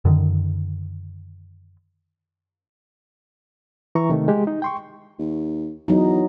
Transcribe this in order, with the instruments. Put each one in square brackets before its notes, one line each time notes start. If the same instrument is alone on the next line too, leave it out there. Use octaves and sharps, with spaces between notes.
[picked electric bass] F#2 D3 D#3
[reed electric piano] E3 A#5 C#6
C3 D#3 A3
G#3 G4
D#4
G5 C6 C#6
[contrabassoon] D#2
[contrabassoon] E2 [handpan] F#3 D#4